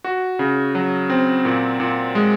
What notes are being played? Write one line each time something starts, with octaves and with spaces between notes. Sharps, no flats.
F#4
C#3
F#3
C4
A#2
A#2
G#3